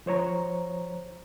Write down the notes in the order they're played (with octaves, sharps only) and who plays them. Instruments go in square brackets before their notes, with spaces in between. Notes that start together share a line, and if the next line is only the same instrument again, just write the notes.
[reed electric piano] F3 C5 C#5 A#5